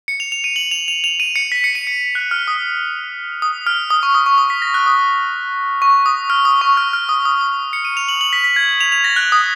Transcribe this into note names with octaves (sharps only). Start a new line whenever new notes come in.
C#7
F7
F7
D#7
F#7
F7
F7
F7
D#7
C#7
B6
C#7
D#7
C#7
F#6
F6
D#6
D#6
F6
D#6
C#6
D#6
C#6
D#6
B6
A#6
F#6
D#6
C#6
D#6
F6
D#6
C#6
F6
F6
D#6
D#6
D#6
C#7
D#7
F7
F#7
F#7
B6
B6
G#6
F7
F7
A#6
F#6
D#6